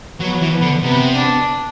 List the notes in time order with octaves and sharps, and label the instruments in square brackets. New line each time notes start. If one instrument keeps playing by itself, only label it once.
[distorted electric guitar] F#3 [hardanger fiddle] B3
[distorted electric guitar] E3
[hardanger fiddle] B3
[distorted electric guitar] D3
[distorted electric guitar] C3 [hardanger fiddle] B3
[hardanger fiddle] D4